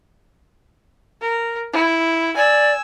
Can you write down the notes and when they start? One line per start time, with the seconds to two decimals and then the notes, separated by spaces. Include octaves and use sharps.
1.21 A#4
1.73 E4
2.37 D5 G#5 E6